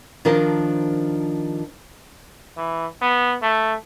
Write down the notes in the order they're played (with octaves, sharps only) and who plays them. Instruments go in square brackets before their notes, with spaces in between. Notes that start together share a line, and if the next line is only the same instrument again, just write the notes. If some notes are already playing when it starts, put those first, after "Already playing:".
[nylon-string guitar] D#3 F3 D4 A#4 C5 A5
[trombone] E3
B3
A3